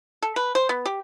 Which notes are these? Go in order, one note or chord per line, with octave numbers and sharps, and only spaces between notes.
A4
B4
C5
B3
G4